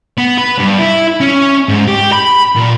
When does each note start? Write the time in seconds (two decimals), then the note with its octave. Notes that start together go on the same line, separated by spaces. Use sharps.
0.18 B3
0.38 B4
0.59 G2
0.79 E4
1.21 C#4
1.69 G#2
1.88 G4
2.13 B5
2.56 A#2